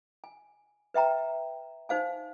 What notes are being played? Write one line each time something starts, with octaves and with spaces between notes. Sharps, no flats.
G#5
B4 E5 G5 A#5
D#4 C5 F5 G#5